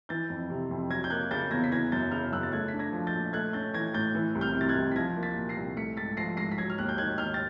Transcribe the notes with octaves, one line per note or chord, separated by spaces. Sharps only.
E3 G6 A6
F2
C3
F2
F#3 G#6 A#6
G6
A#3 F#6 G#6
C#3 G6 A6
E2 G#6 A#6
B6
E3 G#6 A#6
F#2 G6 A6
C#3 F6 G6
F#2 E6 F#6
A6
A3 F#6 G#6
B6
D4
G#6 A#6
F3
G6 A6
A#2
A3 F#6 G#6
C#4 G6 A6
E3 G#6 A#6
A2 G6 A6
E3
C2
F6 G6
C3
A6
F#6 G#6
C2
B6
F3 G#6 A#6
A#3
A6 B6
A#2
A#6 C7
C2
A3 B6 C#7
G#2 A6 B6
F3 A#6 C7
G#2 A#6 C7
B6
F#3 G#6 A#6
F6
D#2 F#6
G6
D#3 F#6 G#6
D#2 F6 G6
A6